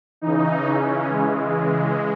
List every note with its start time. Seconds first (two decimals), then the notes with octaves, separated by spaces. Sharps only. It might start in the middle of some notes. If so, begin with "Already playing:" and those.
0.21 C#3 E3 D#4
0.66 C#4
1.09 C#3 E3 G#3